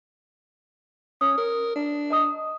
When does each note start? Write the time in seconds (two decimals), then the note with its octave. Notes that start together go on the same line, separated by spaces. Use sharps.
1.21 C#4 D#6
1.38 A#4
1.76 D4
2.10 D#5 A#5 D#6